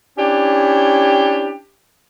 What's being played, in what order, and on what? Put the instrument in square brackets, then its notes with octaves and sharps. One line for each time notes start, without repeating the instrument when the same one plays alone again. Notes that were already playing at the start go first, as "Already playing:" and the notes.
[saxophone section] C#4 D4 E4 G4